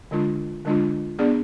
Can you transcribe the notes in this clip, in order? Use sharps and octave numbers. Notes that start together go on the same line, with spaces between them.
D3 G#3 D4 F4
D3 G#3 D4 F4
B3 D4 G#4 D5